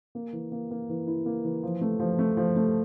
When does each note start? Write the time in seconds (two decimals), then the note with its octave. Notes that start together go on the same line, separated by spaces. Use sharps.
0.15 A#3
0.33 E3
0.52 A#3
0.71 A#3
0.89 E3
1.07 E4
1.26 A#3
1.45 E3
1.63 F3
1.81 A3
2.00 F3
2.19 A3
2.37 F3
2.56 A3